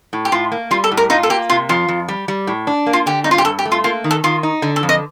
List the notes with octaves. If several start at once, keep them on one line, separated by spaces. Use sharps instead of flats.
A2
G4
A2 F4
A#3
G3 F4
A4
A2
A#4
D#4 F4
A4
A#3 G4
C3 F4
F2 F4
F2
G3
G3
A2
D4
A#3
F4
D3 G4
G2 D#4
F4
G4
G2 A4
G4
A3
F4
A#3 F4
D#3
A4
D#3 F4
D#4
D3
A4
F2
D#5